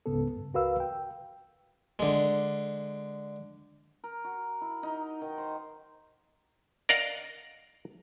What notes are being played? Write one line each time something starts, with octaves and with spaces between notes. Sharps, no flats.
C#2 G#2 C#3 B3 A4
G2
C#2 F#4 A#4 B4 F5 E6
G5
D3 G#3
A#4
F#4
E4
D#4
D#3
C5
A#4 D5 D#5 F5 F#5